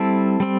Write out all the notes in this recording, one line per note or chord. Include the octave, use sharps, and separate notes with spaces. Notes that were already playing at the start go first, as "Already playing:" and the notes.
Already playing: G3 C4 E4 A4 A5
G3 C4